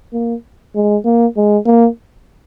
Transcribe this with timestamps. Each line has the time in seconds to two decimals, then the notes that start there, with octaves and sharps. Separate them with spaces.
0.13 A#3
0.75 G#3
1.05 A#3
1.36 G#3
1.66 A#3